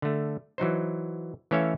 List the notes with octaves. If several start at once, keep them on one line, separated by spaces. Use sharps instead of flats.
D3 A3
E3 F#3 D#4 C5
E3 A3 C#4 C#5 E5 F5